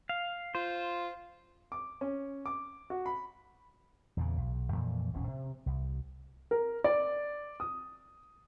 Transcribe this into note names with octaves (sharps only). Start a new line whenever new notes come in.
F5
F4 C5
D6
C#4
D6
F#4
B5
E2 A#2 C#3
B1
F2 A#2 E3 F3
E1 A#1 C4 C#4
C3
C2
A#4
D5
D#6